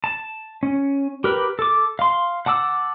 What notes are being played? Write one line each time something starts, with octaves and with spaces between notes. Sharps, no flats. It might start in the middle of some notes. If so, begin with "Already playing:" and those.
A5
C#4
G4 A#4 B4
A4 D6
F5 C6
F#5 A5 D6 E6